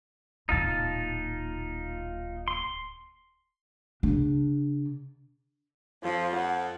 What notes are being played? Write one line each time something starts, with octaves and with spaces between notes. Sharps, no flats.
D1 A#2 D#4 F4 A5
C6
C#3 D4
F2 F3
F#5